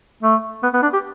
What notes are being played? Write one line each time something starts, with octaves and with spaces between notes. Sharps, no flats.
A3
B3
B3
D4
G4